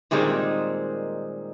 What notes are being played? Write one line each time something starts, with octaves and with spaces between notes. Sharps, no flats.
A#2 D#3 G3 G#3 A#3 C4